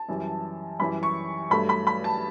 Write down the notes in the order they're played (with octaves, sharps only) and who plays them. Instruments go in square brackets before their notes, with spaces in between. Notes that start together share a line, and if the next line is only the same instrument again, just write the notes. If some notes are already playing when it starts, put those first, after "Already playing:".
Already playing: [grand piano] A5
F#2 E3 G3
F#2 E3 G3 B5
C#6
G2 F#3 A3 B5
B5
B5
A5